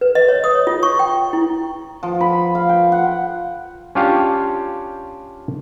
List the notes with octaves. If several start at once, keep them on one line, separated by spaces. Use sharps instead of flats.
B4
D#5
C#5
D#6
C#5
F4
C#6
G5
E4
F3
B5
F5
G5
F#5
C#4 D4 F4 G4 C#5 F5